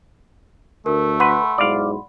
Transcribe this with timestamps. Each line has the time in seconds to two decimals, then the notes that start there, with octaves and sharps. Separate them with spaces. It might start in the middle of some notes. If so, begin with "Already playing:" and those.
0.86 D2 A3 A#4
1.20 B4 F#5 B5 C6
1.58 B1 G#2 E4 D5 F5